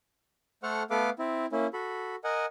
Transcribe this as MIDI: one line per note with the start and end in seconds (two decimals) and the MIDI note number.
0.63 0.83 57
0.63 0.83 69
0.63 0.83 72
0.63 0.83 78
0.63 0.83 85
0.63 0.83 89
0.90 1.10 57
0.90 1.10 59
0.90 1.10 69
0.90 1.10 71
0.90 1.10 77
0.90 1.10 86
1.19 1.46 60
1.19 1.46 64
1.52 1.67 58
1.52 1.67 61
1.52 1.67 64
1.73 2.16 66
1.73 2.16 69
1.73 2.16 83
2.24 2.46 70
2.24 2.46 75
2.24 2.46 78
2.24 2.46 80